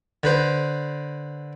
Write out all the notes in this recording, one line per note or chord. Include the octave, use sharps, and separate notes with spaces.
D3 B4 C5